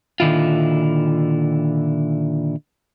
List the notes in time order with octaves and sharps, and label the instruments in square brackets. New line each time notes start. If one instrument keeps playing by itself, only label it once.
[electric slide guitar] A#2 D3 D#3 E4 F4